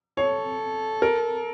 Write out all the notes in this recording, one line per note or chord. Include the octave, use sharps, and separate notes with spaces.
A4 C#5
A#4